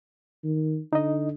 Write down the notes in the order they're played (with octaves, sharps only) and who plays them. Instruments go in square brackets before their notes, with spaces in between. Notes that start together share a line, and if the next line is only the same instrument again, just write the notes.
[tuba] D#3
[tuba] D3 [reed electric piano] D#4 D#5